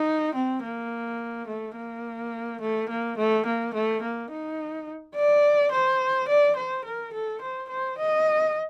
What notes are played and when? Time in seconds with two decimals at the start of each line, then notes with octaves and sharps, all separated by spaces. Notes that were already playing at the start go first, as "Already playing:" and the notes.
Already playing: D#4
0.34 C4
0.63 A#3
1.47 A3
1.76 A#3
2.61 A3
2.89 A#3
3.17 A3
3.46 A#3
3.74 A3
4.02 A#3
4.30 D#4
5.15 D5
5.71 C5
6.28 D5
6.56 C5
6.84 A#4
7.13 A4
7.41 C5
7.69 C5
7.98 D#5